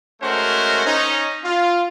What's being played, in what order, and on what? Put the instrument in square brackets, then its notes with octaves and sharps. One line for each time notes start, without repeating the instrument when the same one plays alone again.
[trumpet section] G#3 A3 C#4 F#4 A#4 C5
C#4 D#4
F4